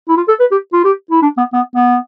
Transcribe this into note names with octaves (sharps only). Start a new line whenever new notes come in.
E4
F4
A4
B4
G4
F4
G4
E4
D4
B3
B3
B3